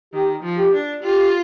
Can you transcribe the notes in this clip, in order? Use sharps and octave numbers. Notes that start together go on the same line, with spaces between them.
D#3 G4
F3
G4
D4
F4 G4